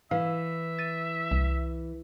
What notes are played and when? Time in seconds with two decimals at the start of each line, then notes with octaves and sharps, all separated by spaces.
0.11 E3 E5 F5
0.79 A6 D#7
1.31 C2